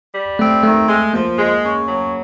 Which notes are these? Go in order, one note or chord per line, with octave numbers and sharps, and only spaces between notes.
G3
A3 C4
D#3 A3
G#3
F3 A#3
G#3
C#3
F#3